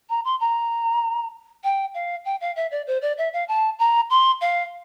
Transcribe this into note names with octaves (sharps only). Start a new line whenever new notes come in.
A#5
C6
A#5
G5
F5
G5
F5
E5
D5
C5
D5
E5
F5
A5
A#5
C6
F5